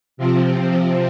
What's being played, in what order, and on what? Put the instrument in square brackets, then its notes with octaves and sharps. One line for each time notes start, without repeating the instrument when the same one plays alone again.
[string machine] C3 F3 C4